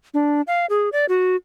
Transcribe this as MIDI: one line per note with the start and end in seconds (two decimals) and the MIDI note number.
0.14 0.42 62
0.47 0.66 77
0.70 0.89 68
0.92 1.06 74
1.09 1.36 66